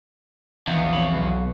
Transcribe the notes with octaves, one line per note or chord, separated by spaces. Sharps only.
A#1 E2 D#3 B3 F5
F2 C#5 B5
B1 B2 F#4